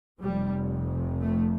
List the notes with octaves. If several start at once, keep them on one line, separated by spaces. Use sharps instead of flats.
F1 F2 C3 G3
A3